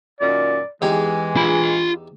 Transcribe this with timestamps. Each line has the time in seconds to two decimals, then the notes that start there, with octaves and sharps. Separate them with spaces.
0.20 F#2 A#2 D#3 D5
0.82 E2 E3 G#3 D#4 G4
1.36 F4 B5